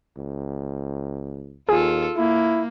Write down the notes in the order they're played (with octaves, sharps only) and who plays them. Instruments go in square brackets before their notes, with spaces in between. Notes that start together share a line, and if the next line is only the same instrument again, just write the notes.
[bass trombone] C#2
[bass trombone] D#2 [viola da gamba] F4 A4 [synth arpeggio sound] G#4
[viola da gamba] A#3 [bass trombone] E4